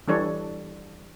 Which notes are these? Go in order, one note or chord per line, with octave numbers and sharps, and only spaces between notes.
E3 G3 D4 A4 C#5